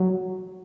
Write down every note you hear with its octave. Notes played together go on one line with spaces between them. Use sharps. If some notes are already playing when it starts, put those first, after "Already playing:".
Already playing: F#3